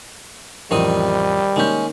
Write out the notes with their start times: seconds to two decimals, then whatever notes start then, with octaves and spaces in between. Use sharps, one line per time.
0.71 A1 F2 D#3 G3 C4 D#6
1.56 D#3 G#3 A#3 C#4 G6